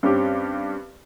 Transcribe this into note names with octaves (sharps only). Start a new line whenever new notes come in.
G2 C4 C#4 G4